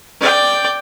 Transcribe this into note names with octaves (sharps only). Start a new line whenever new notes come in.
D5 G5